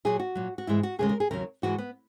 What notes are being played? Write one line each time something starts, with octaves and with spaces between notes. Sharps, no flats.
A#2 F#3 G#4
F#4
A#2 F#3
F#4
G#2 E3 G#3 E4
F#4
D#2 C#3 G#3 G#4
A#4
G#4
D#2 C#3 F#3 A#4
G#2 E3 G#3 F#4
B3